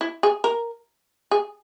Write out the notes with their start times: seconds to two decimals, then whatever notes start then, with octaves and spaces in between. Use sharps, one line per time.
0.01 E4
0.23 G#4
0.44 A#4
1.31 G#4